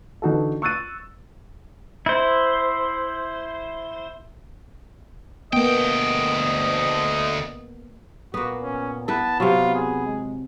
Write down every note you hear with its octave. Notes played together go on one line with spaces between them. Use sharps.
D3 E3 D#4 F#4 A4
C#6 E6 F#6 A6 D#7
E4 C5
D2 A#3 B3 D#5 G5
A#2 A#3 B3 F#4
C#4
B3 E4 B4 A5
C3 F#3 F4
G#4
G#3